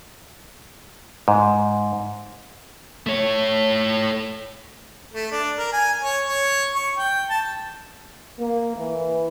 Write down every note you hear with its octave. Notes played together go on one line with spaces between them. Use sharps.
G#2
A3 C#5
A3
D4
A#4
G#5
C#5
C#5
C#6
G5
A5
A#3
E3